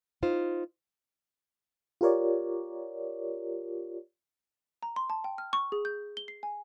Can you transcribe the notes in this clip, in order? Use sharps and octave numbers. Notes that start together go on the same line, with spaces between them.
D#4 F4 C5
F4 G4 A#4 C#5 D5
A#5
C6
A5
G5
F6
C#6
G#4
G6
G7
C7
G#5